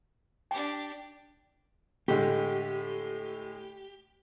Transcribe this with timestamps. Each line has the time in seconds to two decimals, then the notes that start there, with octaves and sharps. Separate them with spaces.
0.51 D4 G4 G5
2.08 A2 D3 G#3 G4